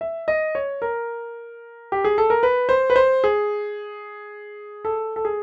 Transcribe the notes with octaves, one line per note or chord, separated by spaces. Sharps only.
E5
D#5
C#5
A#4
G4
G#4
A4
A#4
B4
C5
B4
C5
G#4
A4
A4
G#4